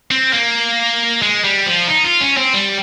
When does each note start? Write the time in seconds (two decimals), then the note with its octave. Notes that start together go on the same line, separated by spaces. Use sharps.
0.11 C4
0.33 A#3
1.22 G#3
1.44 G3
1.66 F3
1.88 D#4
2.04 F4
2.21 C#4
2.37 C4
2.54 G3